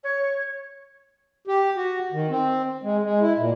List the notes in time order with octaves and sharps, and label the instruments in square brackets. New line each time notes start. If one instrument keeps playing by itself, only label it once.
[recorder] C#5
[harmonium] G4
F#4
D#3
C4
G#3
G#3
E4
A#2